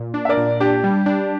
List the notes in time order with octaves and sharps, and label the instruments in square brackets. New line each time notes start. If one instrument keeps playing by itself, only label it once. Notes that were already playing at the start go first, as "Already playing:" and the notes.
Already playing: [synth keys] A#2
D4
[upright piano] E5
A#4 D5
[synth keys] A#2
[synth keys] D4 [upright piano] G4
[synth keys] G3
D4